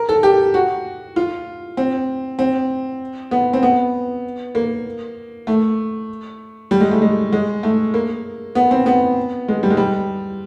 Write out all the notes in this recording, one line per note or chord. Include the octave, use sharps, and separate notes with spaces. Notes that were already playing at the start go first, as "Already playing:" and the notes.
Already playing: A#4
A4
G4
F#4
F4
C4
C4
B3
C4
B3
A#3
A3
G3
G#3
A3
G#3
G#3
A3
A#3
B3
C4
B3
G#3
G3
G#3
G3